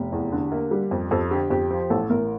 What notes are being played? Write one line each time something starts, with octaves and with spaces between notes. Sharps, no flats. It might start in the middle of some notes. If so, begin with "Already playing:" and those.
Already playing: F1 G4
E2
D3
A#3
G3
F2
F2 A4
D3 G4
F2 G4
F3
A1 A4
A1 A#4